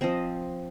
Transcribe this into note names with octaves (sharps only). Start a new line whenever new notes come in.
F3 C4 C5 D#5